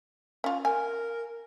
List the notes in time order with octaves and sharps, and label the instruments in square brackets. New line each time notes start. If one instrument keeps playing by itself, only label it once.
[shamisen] C#4 F4
[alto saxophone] A#4 [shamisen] G#5